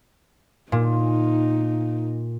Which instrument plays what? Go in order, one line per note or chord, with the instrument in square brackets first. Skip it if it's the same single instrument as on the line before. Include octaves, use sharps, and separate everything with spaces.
[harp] A#2 [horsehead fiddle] D#4